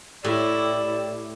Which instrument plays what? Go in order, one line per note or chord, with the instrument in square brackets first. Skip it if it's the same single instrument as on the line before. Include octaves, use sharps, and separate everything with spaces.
[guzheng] A2 [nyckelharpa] E4 [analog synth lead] G4 [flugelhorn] D5